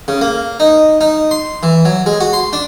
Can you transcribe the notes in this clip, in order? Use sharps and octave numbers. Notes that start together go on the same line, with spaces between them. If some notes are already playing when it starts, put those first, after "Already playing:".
C#3
A#3
D#4
D#4
C6
E3
F#3
G#3
F#4
C6
D4